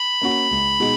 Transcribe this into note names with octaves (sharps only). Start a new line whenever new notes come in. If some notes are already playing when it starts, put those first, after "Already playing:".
Already playing: B5
A#3 C#4 F#4
C#2
B2 G#3 D#4 F#4